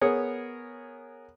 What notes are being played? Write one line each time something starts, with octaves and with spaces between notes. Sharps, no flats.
B3 G#4 A#4 C#5